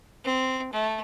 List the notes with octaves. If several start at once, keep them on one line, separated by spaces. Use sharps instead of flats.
C4
A3